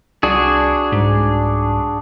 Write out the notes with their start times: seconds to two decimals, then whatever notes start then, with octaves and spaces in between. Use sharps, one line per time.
0.23 C2 D4 F#4 G#4
0.92 C2 G#2